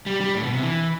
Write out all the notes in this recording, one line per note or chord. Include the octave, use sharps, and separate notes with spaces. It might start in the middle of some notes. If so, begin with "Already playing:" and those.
G3
G3
A2
B2
C3
E3